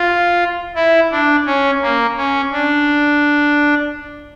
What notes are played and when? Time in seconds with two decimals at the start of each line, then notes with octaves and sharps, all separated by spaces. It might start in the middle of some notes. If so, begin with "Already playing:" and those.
Already playing: F4
0.76 E4
1.11 D4
1.46 C#4
1.82 A#3
2.16 C#4
2.51 D4